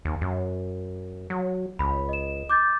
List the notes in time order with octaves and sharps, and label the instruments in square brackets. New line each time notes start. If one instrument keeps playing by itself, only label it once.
[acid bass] D#2
F#2
F#3
[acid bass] C#2 [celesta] B5
[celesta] D#5 E7
D6 G6 A6